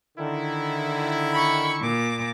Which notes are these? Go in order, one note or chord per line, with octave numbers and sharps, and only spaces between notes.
D3 D#3 E4
B5 C#6
A#2 D6